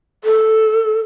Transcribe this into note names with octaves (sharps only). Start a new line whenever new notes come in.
A4